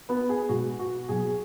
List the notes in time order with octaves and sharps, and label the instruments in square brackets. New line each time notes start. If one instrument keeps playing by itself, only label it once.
[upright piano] B3 B4
G#4
B2 G#3 F#4
F#4
B2 F#3 G#4